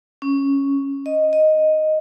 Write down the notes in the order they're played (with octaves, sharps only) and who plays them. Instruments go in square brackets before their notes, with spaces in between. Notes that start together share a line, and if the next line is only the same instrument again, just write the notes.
[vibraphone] C#4
D#5
D#5